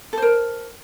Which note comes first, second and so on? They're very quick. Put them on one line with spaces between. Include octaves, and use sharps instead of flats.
A4 C5 A#4